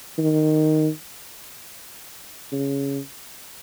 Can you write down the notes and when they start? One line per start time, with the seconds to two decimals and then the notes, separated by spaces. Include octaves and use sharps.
0.18 D#3
2.52 C#3